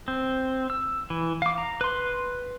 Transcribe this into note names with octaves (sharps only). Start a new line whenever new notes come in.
C4
E6
E3
F5 D6
A#5
B4 C6